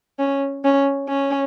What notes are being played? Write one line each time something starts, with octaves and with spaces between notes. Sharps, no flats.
C#4
C#4
C#4